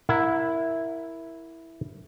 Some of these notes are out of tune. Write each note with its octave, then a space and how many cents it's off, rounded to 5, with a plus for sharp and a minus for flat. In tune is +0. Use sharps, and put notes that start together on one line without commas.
E4 +0 A#4 +0 F#5 -30